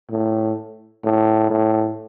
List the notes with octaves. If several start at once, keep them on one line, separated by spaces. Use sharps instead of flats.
A2
A2
A2